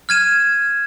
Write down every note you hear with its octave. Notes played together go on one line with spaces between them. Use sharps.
F6 G#6 D#7 E7